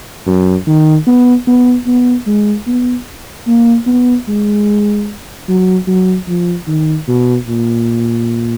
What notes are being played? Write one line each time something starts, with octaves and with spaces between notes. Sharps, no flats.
F#2
D#3
B3
B3
B3
G#3
B3
A#3
B3
G#3
F#3
F#3
F3
D#3
B2
A#2